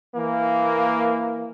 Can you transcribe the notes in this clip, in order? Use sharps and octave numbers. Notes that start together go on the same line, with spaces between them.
E3 A#3